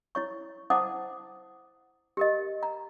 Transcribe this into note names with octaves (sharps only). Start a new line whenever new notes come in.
E4 C#5 C#6
E4 C5 F#5 A5 D6 D#6
G4 A#4 D#5
A#5